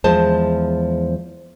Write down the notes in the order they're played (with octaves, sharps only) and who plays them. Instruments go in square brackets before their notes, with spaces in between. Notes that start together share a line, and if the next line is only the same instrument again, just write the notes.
[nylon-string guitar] E2 F3 G#3 C5 A5